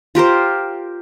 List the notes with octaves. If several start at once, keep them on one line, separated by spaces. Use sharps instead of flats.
F4 G4 A#4 C5